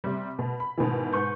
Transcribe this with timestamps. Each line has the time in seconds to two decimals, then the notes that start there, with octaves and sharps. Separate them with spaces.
0.04 C3 G3
0.39 B2
0.60 B5
0.78 G#2 B2 D#3 E3
1.13 G#2 B4 C#6 G6